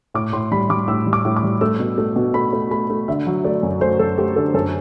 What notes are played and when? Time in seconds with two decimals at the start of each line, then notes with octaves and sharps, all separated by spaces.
0.14 A2 D6
0.33 A2 C6
0.51 G3 B5
0.69 G3 D6
0.88 A2 E6
1.06 G3
1.13 D6
1.25 A2
1.36 D6
1.43 G3
1.61 A3 E6
1.79 B2
1.98 A3
2.16 B2
2.34 A3 B5
2.53 A3
2.71 A3 B5
2.90 A3
3.08 D3 E5
3.27 F#3
3.45 A3 D5
3.63 F#2
3.81 A3 C5
3.99 F#2 A4
4.18 A3 G4
4.36 D3 A4
4.54 F#2 A4